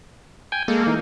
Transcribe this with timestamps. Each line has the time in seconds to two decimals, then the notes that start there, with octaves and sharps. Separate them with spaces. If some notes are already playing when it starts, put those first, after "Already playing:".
0.52 G5 G#5
0.68 G#3 A#3 A4
0.87 E3 D#4